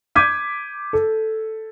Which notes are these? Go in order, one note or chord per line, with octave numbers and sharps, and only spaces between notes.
D6 G6 G#6 B6 D#7
A4